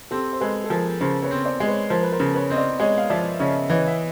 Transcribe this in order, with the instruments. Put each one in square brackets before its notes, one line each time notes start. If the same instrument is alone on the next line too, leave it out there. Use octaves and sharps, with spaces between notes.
[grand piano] C4 [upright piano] G4 A4
[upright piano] C5
[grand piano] G#3 [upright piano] A4 B4
[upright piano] A4
[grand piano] F3 [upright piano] G#4 A#4
[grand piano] C#3 [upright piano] A#4 C5
[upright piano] B4 C#5
[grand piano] C4
[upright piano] C5 D5
[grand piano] G#3
[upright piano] B4 C#5
[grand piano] F3 [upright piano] A#4 C5
[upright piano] B4
A#4 C5
[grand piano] C#3
[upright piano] B4 C#5
[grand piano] C4 [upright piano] D#5
[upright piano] C5 D5
[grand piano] G#3 [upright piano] C#5 D#5
[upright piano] F5
[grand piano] F3 [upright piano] D5 E5
[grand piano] C#3 [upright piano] C#5 D#5
[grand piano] E3 [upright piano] C#5 D#5
[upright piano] E5